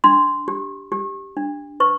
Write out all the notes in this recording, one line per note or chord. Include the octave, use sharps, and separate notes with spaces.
D4 C6
G4
G4
D4
B4 C#6